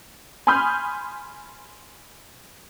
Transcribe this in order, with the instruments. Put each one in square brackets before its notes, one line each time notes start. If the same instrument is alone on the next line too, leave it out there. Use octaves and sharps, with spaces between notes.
[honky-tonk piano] G#5 B5 C6 D#6 F6 G6